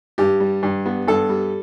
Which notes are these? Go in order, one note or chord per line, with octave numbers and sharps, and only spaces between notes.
G2 G4
G3
G2
B3
G2 A4
G3